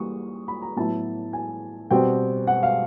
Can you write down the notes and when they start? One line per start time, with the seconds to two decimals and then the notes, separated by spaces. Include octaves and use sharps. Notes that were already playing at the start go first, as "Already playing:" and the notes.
Already playing: E3 G3 A#3 C#6 D#6
0.48 B5
0.62 A#5
0.76 A2 F#3 B3 E4 A5
1.33 G#5
1.91 B2 G3 C4 G5
2.47 F#5
2.63 F5